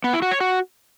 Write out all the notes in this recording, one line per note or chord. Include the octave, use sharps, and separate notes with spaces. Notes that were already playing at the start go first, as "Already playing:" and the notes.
B3
E4
F#4
C#5
F#4